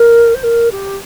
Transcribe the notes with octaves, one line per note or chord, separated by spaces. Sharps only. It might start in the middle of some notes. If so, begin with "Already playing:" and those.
Already playing: A#4
C5
A#4
G4